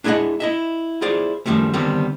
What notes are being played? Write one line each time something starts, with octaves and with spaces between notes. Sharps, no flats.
D4 E4 G#4 D5 D#5 F#5
E4 D#5 E5
E4 F4 G#4 C5 D5
F#2 B2 D#3 F3 G3 A3
D3 D#3 G3 B3 C4